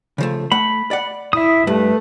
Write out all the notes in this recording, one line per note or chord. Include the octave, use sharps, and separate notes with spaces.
C#3 F3 A3
A3 F#5 B5
D5 F#5
E4 E5 D#6
G2 A3 B4